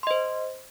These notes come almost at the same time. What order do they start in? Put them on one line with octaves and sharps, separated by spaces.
C6 D#5 C5